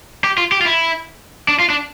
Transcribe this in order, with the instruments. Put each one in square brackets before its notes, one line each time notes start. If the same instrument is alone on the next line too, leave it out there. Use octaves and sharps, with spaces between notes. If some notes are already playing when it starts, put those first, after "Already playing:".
[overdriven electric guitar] G4
F4
G4
F4
E4
D4
F4
D4